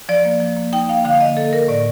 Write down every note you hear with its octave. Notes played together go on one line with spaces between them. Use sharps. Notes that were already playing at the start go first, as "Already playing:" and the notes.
F3 D5
A#3
F3
A#3
D#4 G5
A#3 F5
D3 F5
F5
A#3 D#5
A#3 A4
A#3 A#4
A2 D5